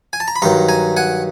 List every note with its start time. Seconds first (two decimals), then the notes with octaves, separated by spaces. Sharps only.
0.13 G#5
0.20 A5
0.28 A#5
0.36 B5
0.42 G2 D#3 F#3 A#5 C6
0.69 G#5 A#5
0.97 F#5 G#5